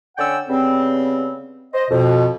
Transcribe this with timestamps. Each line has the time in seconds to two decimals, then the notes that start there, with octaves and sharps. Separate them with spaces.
0.18 D3 C#4 D5 F#5 G5 E6
0.49 C#3 G3 B3 C4
1.74 C5 D#5
1.90 F2 B2